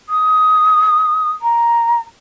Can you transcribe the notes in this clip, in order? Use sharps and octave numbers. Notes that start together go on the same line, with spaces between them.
D#6
A#5